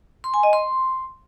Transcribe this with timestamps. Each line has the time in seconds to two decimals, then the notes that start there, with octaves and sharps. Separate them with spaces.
0.24 C6
0.34 G#5
0.43 D#5
0.53 C6